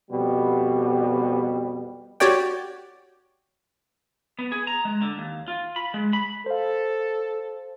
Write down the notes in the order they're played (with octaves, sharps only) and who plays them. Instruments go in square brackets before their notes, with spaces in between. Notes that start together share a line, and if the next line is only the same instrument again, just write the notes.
[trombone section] F2 B2 G3
[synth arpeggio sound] F#4 G4 C#5 D5 G5
[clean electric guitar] B3
G#4
A#5
G#3
D3
D#2
F4
B5
G#3
B5
[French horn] A4 [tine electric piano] C5 F5